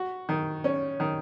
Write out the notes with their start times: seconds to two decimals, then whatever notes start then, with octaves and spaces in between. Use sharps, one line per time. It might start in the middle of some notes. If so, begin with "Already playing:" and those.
Already playing: F#4
0.29 D#3
0.64 C#4
1.00 D#3